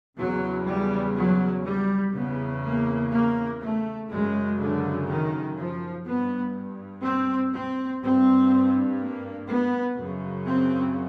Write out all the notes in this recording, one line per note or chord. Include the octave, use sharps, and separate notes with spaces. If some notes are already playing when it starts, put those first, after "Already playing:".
E2 C#3 F#3
G3
F#3
G3
E2 C#3 B3
A#3
A#3
A3
F#2 C#3 G#3
D3
D#3
F3
G2 B3
C4
C4
G2 C4
A#3
B3
F#2 C#3
C4